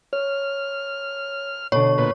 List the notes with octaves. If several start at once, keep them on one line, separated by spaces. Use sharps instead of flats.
C#5 F6
B2 D3 C#5 C#6
A#2 B4